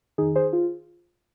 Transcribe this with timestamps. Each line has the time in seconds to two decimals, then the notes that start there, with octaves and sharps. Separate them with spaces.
0.18 F2 D#3 D#4 G#4
0.35 G#4 C5
0.53 F4